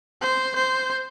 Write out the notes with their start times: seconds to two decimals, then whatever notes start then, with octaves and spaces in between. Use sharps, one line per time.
0.22 C5
0.56 C5